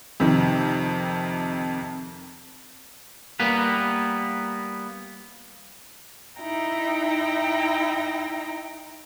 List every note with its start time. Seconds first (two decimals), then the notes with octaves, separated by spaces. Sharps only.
0.20 F2 C3 D#3
3.40 G3 A#3 B3 B4
6.39 D#4 E4 G5 A#5